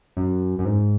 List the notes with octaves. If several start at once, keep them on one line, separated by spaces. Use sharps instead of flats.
F#2
F#2
G#2